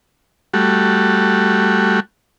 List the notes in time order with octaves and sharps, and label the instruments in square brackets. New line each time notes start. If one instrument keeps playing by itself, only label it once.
[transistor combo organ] G3 A3 F#4